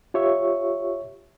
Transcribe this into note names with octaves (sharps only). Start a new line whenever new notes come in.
F4 G4 C#5 E5 C#6